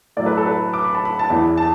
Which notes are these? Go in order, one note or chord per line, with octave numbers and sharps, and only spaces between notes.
A2 F#3 D5
B4
A4
B4
D6
B5
A5
B5
A5
E2 E3 B5
A5